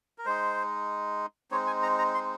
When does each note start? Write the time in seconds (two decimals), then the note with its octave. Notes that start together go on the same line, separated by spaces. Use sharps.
0.18 A#4
0.25 G#3 D#4 C5
1.51 G#3 C4 D#4 C#5
1.67 G#5
1.83 A#5
1.98 A#5
2.15 C6